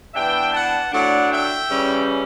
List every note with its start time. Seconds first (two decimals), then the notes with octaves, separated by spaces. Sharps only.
0.14 E3 B3 D4 E5 G5
0.52 F#5 A5
0.92 A2 F#3 A3 D4 D5 F#5
1.30 E5 G5
1.69 C#3 E3 G3 C#4